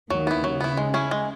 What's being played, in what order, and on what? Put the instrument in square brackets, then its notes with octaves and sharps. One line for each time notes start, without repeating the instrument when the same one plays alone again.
[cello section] D#2 D#3 [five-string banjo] F#3
[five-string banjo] B3 E4
[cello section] C#3 [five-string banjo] F#3
[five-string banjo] B3 E4
G#3
C#4 E4 G#4
G#3